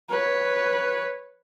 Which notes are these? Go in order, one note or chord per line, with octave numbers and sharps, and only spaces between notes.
B4 C#5